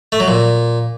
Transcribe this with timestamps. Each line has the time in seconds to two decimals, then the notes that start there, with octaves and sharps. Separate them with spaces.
0.12 A3
0.20 F#3
0.28 A#2